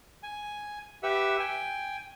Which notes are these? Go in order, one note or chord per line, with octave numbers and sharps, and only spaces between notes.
G#5
G4 B4 E5 F#5 E6
G5 G#5